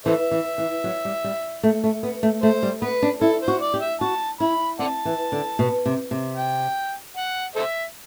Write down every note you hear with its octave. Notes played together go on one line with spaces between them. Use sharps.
E3 A4 C5 E5
E3
E3
F#3
G3
G3
A3
A3
B3
A3
A3 C5
G3
B3 B4
D4
E4 A4
C5
F#4
D5
G4
E5
F#4 A5
E4 B5
C4 D5 F#5 A5
E3
D3
B2
C3
C3
G5
F#5
A4 C5 E5